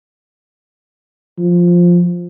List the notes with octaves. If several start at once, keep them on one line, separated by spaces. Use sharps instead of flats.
F3